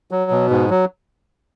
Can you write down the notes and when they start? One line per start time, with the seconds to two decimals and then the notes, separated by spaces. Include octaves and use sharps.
0.11 F#3
0.31 B2
0.50 G#2
0.70 F#3